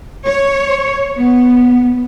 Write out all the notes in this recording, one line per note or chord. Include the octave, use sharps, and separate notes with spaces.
C#5
B3